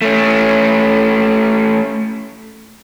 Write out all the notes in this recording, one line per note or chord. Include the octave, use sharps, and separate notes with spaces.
A3 C#4